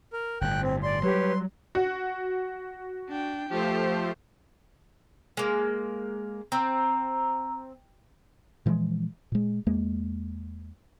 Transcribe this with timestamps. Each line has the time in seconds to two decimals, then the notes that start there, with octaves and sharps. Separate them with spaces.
0.13 A#4
0.41 G1 A2 G5 F#6
0.62 C4
0.83 D5 C6
1.03 F#3 G3 G4 B4 C#5
1.75 F#4
3.09 D4 G5
3.49 F3 A3 G4 C5
5.37 G#3 A#3
6.52 C4 A#5 E6
8.66 A#2 E3 F3 G#3
9.32 A#2 G#3
9.67 E2 G#3 A#3